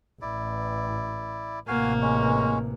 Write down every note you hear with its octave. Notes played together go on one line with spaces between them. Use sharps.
A1 E4 D5
A1 C3 A#3 F#4 F5 G#5
G#3 C#4